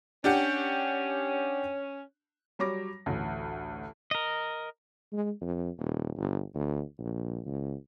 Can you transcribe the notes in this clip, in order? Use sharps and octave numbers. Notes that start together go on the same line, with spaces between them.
C#4 D4 G4 F#5
F#3 G3 C#5 D6 A#6
A1 D2
A#4 D#5
G#3
F2
D#1
G1
D2
A#1
C#2